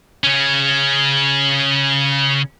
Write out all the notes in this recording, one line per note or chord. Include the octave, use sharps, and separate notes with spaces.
C#3 C#4